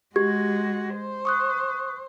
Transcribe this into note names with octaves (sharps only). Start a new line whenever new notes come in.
G#3 F#4 G4 G#6
C5
C#6 D#6 F#6